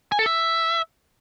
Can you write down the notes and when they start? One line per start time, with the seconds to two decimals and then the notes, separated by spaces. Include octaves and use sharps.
0.12 G#5
0.19 A4
0.26 E5